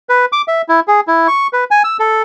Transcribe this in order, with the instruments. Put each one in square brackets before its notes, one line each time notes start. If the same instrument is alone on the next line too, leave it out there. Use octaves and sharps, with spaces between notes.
[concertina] B4
D6
E5
E4
G#4
E4
C#6
B4
G#5
E6
A4